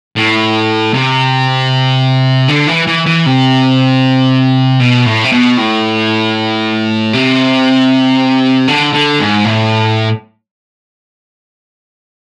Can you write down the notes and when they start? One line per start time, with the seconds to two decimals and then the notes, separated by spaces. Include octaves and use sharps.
0.16 A2
0.94 C3
2.49 D3
2.68 E3
2.87 E3
3.06 E3
3.26 C3
4.80 B2
5.06 A2
5.24 C3
5.32 B2
5.58 A2
7.13 C3
8.68 D3
8.93 D3
9.20 G#2
9.45 A2